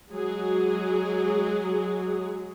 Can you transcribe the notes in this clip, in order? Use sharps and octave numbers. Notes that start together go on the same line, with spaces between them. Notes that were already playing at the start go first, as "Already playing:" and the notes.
F#3 G#3 G#4